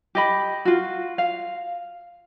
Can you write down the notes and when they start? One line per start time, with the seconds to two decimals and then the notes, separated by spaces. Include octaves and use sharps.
0.15 G4 D#5 B5
0.65 F4 F#4
1.18 F5